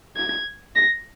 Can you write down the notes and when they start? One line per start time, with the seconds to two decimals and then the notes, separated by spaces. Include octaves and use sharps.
0.17 G#6
0.76 A#6